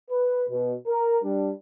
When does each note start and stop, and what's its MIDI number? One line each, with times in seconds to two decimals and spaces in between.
0.10 0.45 71
0.50 0.74 47
0.87 1.18 70
1.23 1.51 55
1.23 1.51 62